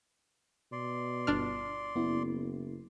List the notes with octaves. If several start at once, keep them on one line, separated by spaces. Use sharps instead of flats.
B2 D5 C6
G1 D4 F6
F#1 B3 E4